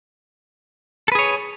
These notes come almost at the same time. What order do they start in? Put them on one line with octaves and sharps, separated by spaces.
A4 B4 G#4 C#5